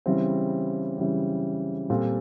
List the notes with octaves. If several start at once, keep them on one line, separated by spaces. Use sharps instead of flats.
C#3 E3 G3 C4
C#3 E3 G3 C4
A#2 G3 C4 F4 A4